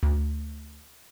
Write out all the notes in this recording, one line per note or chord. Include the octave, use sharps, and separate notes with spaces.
D2